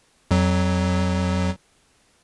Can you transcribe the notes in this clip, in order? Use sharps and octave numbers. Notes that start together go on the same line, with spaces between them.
F2 F#3